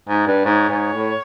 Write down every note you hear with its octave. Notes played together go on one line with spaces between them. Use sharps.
G#2
G2
G#2 C#5
G#2
A2